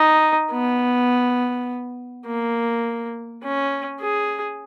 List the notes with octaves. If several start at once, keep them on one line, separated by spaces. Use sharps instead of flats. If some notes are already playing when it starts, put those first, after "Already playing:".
Already playing: D#4
B3
A#3
C#4
G#4